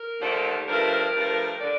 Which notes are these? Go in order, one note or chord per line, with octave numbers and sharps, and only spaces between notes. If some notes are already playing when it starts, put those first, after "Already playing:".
Already playing: A#4
D#2 D3 F3 A3
G2 F3 A3 A#4
G2 F3 A3
D3 D5